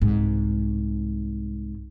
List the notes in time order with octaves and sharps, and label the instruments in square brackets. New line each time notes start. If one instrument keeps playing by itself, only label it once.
[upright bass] C2 G#2